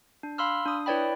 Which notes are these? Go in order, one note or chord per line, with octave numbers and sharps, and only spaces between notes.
D4
F5 B5 C6 E6 F6
D4 D#6
E4 B4 C#5 D5 G5 B5